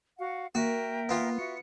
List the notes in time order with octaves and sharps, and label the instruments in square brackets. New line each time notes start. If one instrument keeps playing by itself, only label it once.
[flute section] F#4 F5 F#5
[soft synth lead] A#3 [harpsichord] F#4 [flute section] A#4 E5 G5
[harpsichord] B3 F4
[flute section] F#4 E5 [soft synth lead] C#7